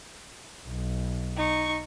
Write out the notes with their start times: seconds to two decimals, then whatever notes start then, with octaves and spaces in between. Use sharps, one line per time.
0.66 B1
1.37 D#4 C#6